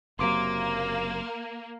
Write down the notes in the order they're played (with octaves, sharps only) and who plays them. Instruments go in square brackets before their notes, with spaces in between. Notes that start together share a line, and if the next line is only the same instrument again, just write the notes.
[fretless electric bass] F#1 C3 F#3 [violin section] A#3 [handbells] C6 D6 D7